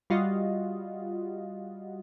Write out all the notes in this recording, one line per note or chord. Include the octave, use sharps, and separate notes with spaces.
G3 F4 F#4 D#5